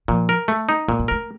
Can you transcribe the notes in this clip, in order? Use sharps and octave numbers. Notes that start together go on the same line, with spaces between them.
A#2 F3
A#4
A3
D#4
A#2 A3
G3
A3 A#4